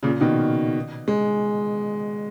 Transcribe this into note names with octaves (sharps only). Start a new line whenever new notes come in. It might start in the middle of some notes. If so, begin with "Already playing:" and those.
A#2 C#3
B2 D#3
G#3